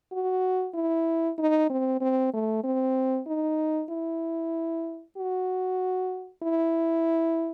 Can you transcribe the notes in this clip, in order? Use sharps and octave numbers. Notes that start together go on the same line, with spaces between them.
F#4
E4
D#4
C4
C4
A3
C4
D#4
E4
F#4
E4